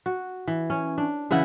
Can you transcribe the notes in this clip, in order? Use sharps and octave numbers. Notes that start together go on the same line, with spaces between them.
F#4
E3
C#4
D4
C#3 E3 E4 F#5